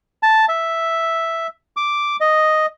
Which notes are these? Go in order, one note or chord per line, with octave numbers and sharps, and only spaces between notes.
A5
E5
D6
D#5